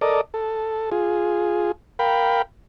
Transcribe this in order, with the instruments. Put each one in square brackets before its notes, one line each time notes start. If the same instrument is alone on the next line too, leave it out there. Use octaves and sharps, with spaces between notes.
[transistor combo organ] A4 A#4 D5 D#5
A4
F4 G#4
A#4 F5 G5 B5